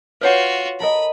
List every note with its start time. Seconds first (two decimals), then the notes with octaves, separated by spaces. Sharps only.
0.21 F4 F#4 B4 C#5 F#5
0.80 A4 A#4 D#5 B5